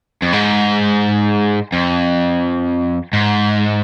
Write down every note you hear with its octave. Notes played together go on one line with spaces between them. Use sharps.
F2
G#2
F2
G#2